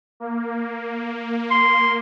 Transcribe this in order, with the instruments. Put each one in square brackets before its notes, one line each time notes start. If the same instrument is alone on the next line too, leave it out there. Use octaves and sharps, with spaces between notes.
[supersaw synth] A#3
[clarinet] C6